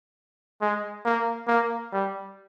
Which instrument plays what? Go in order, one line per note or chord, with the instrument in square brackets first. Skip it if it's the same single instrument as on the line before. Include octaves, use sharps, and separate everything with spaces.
[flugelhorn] G#3
A#3
A#3
G3